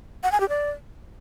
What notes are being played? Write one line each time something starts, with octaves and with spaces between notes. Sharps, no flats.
F#5
G#5
G4
D5